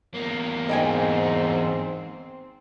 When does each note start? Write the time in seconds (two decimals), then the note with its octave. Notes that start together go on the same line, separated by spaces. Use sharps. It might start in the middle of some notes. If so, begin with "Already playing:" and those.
0.14 E2 A#3
0.69 G#2 C4 D#5 G5 G#5